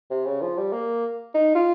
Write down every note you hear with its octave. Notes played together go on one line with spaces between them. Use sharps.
C3
C#3
F3
G3
A#3
D#4
F4